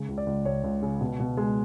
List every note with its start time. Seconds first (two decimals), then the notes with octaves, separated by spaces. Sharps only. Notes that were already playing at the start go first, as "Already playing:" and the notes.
Already playing: C#3 G#3
0.08 C#2
0.18 D5
0.27 C#2
0.45 C#2 C#5
0.64 C#2
0.82 C#3
1.01 B2
1.20 B2
1.37 G#3